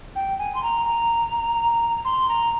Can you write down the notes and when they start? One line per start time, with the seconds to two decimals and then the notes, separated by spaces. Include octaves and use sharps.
0.16 G5
0.39 G#5
0.55 C6
0.63 A#5
0.86 A#5
2.05 C6
2.29 A#5